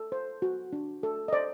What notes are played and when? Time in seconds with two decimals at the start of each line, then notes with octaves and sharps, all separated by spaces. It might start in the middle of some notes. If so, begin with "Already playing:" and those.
Already playing: A4
0.12 C5
0.42 F#4
0.73 D4
1.03 A4
1.28 D#5
1.33 C5 D5